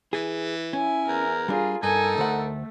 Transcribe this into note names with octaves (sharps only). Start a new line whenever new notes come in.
E3 G#4
C#4 E4 G#5
E2 A#4
G3 D4 F4 G#4
G2 D#4 A4 A#4 G#5
D2 A3 C5 F#5